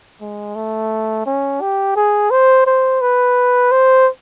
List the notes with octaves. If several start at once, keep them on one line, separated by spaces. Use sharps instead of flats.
G#3
A3
C#4
G4
G#4
C5
C5
B4
C5